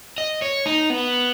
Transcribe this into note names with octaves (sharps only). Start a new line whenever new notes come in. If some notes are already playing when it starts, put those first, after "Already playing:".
D#5
C#5
D#4
B3